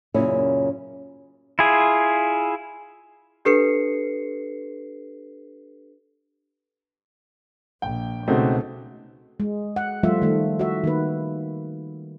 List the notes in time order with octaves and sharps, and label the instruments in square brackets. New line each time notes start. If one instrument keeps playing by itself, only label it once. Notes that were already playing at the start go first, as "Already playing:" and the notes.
[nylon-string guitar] F#2 A#2 C#3 C#4 E4
[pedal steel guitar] E4 F4 G#4
[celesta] D4 G4 A4 B4 C7 C#7
[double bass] A#1 [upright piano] G5
[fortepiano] C#2 A3 [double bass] B2 [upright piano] C4 D#4 F#4
[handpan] G#3
F#5
F3 G3 A3 F4 E5
D#3 A3
F#4 E5
D#3 A#3 B4